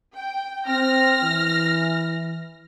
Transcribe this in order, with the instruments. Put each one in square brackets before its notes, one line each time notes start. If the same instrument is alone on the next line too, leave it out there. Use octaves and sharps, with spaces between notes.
[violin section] G5
[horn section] C4 [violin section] F6 A#6
[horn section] E3